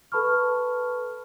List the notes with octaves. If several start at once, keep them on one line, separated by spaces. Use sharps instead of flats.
A4 B4 A5 B5 C#6 F6